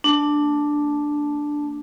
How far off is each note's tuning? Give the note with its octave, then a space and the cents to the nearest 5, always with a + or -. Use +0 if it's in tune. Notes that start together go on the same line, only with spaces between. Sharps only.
A#3 -40 D4 +0 A5 -5